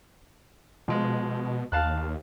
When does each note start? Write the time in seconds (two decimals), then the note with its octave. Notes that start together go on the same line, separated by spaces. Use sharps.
0.88 B2 F3 G#3
1.72 D#2 F5 A5 F#6